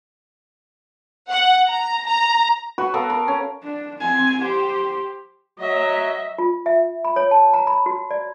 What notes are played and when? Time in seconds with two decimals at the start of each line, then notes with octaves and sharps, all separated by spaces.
1.31 F#5
1.69 A#5
2.05 A#5
2.78 F#4 B4 C#6
2.94 B3 A4 A#4 F5
3.10 A#4
3.28 C#4
3.63 D4
4.00 C4 G#5
4.42 G4 C5
5.60 F#3 D#5 E5
6.38 F4
6.66 E5
7.05 B5
7.16 C#5
7.31 A5
7.54 A#5
7.67 B5
7.86 F#4
8.11 D5